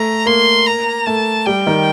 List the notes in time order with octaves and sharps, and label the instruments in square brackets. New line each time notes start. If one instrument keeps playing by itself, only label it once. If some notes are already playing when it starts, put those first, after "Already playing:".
Already playing: [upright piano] A3 [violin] A#5
[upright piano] A#3 [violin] C6
[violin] A#5
[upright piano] A3 [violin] A5
[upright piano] G3 [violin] G5
[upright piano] D#3